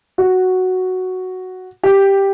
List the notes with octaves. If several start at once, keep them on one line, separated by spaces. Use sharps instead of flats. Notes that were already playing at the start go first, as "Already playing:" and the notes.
F#4
G4